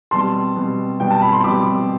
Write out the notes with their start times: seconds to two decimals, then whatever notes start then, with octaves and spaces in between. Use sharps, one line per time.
0.11 B2 G3 C4 A5 C6
0.56 B2 G3 C4
1.00 B2 G3 C4 G5
1.11 A5
1.22 B5
1.33 C6
1.44 B2 G3 C4 B5 D6